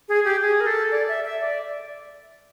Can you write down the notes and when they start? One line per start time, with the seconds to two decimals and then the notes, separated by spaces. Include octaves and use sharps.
0.09 G#4
0.25 G4
0.41 G#4
0.61 A#4
0.66 A4
0.91 D5
1.08 E5
1.25 E5
1.41 D5